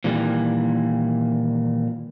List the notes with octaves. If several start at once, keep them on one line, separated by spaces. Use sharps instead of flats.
A#2 D#3 E3 G3